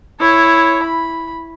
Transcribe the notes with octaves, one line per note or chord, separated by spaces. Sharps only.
E4 C#5
B5